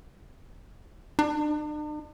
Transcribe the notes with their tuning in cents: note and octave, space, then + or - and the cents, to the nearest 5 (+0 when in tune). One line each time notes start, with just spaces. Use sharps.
D4 +45